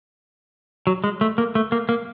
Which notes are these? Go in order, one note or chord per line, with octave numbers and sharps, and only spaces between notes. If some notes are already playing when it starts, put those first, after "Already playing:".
F#3
G#3
A3
A#3
A3
A#3
A#3